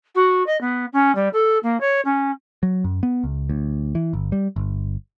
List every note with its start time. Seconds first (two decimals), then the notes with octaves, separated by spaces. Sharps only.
0.15 F#4
0.46 D#5
0.60 B3
0.92 C#4
1.15 G3
1.33 A4
1.63 A#3
1.80 C#5
2.04 C#4
2.63 F#3
2.84 F#2
3.03 B3
3.24 C#2
3.49 D2
3.95 E3
4.13 G1
4.32 G3
4.56 G1